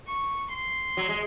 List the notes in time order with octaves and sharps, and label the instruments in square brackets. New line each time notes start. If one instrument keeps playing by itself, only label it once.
[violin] C#6
C6
[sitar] F#3
G#3